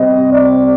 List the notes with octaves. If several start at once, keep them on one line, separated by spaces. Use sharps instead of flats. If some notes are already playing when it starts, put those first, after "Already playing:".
Already playing: C3 G3 C4 D#5
D5